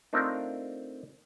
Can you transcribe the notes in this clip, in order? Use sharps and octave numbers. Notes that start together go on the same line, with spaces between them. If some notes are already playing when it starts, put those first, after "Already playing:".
A3 C4 D4 D#4 F4 A#4